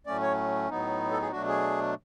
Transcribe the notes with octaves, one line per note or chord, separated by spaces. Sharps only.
A2 F#3 A3 C#4 D5
C#5
A2 F#3 B3 D#4
A4
G#4
B2 F#3 A3 D4 F#4
G#4